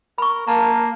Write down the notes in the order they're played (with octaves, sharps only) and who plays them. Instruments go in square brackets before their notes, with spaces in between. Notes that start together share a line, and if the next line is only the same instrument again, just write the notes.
[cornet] A#4 [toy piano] B5 C#6
[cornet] A#3 [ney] A#4 [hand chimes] A5 A#5